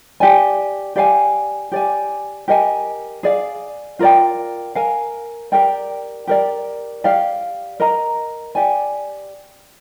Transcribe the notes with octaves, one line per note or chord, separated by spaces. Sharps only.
G4 D5 G#5
G4 D5 F5 G#5
G4 D5 G#5
G4 A#4 D#5 G#5
G#4 D5 F5
F4 A#4 D5 G5
A#4 F5 G#5
G4 A#4 D5 G5
G4 A#4 D5
G4 D5 F5
A#4 D#5 A#5
G4 D5 G#5